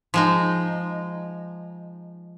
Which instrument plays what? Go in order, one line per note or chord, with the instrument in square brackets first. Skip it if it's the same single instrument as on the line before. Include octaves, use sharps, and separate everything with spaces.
[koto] F3 G#3 D#4